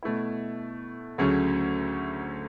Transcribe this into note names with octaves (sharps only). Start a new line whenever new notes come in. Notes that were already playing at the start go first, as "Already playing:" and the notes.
B2 A3 E4
D2 C#3 F#3 A3 C#4